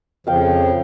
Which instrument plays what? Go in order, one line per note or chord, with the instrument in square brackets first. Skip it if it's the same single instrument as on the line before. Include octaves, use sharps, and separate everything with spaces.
[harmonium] F2 C#3 F3 [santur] F5 G5